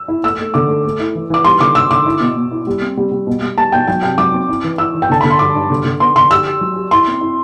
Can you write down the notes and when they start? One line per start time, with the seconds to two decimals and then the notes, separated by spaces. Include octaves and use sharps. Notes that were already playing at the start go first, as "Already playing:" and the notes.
Already playing: E6
0.08 E4
0.23 A3 E6
0.39 A3
0.54 D3 D6
0.69 A3
0.85 A3
1.00 E4
1.15 E3
1.30 E3 D6
1.44 G3 C6
1.60 D3 D6
1.75 D3 E6
1.91 D3 D6
2.06 E4
2.20 B2
2.37 B2
2.51 E4
2.67 G3
2.81 C4
2.97 G3
3.12 G3
3.27 B2
3.42 G3
3.57 G3 A5
3.72 B2 G5
3.87 F#3 G5
4.03 C3 G5
4.18 F#3 D6
4.34 C4
4.49 E4
4.64 E3
4.78 E4 E6
4.94 E3
5.02 G5
5.10 D3 A5
5.21 D3 B5
5.31 C6
5.39 G2 D6
5.55 G2
5.70 D3
5.85 D3
6.00 B3 C6
6.16 D3 C6
6.31 G4 E6
6.46 G4
6.61 F#3
6.76 G4
6.91 E4 C6
7.07 C4
7.21 E4